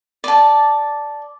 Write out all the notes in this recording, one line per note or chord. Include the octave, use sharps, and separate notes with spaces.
D5 A5